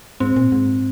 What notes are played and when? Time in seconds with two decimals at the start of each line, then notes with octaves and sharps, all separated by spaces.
0.20 G#2 C4
0.36 A#2
0.52 G#2